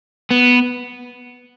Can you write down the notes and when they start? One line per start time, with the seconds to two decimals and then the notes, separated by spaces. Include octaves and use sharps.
0.31 B3